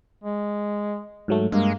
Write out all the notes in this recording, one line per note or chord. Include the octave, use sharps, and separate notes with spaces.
G#3
G#2 F#3 A3
G2 G#3 A#3